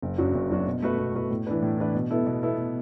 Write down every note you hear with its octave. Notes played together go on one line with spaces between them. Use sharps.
F#1
F#2 F#3 D4 F#4
F#1
F#2 F#3 D4 F#4
B2
A3 F#4 B4
B2
A3 F#4 B4
A2
E3 D4 B4
A2
E3 D4 B4
B2
B3 E4 A4
B2
B3 E4 A4